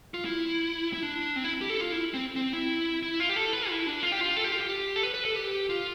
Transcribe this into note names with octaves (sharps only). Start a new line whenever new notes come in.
F4
E4
E4
D4
C4
E4
G4
A4
F4
E4
C4
C4
E4
E4
F4
G4
A4
B4
E4
D4
F4
G4
F4
A4
G4
F4
G4
A4
B4
B4
A4
G4
F4